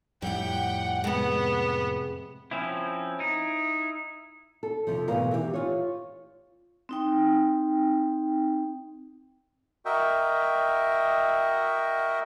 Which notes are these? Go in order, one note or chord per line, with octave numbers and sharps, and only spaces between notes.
F2 A2 G3 E4 F#5 G5
C3 G#3 B3
F3 C4 C#4 E4
D#4 E4
A4
F2 C3 F3
D2 G#2 B2 E3 A#4 F5
E3 G4
F4 C#5
C4 D#4 G5
F#4 A#4 D#5 E5 G5